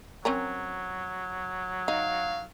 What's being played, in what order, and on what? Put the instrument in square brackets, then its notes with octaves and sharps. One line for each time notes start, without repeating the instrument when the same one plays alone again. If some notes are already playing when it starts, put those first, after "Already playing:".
[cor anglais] F#3 [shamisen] C4 C#4 A#4
[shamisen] D#4 [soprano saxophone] F5